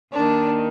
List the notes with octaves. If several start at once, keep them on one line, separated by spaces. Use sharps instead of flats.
D#2 D#3 D4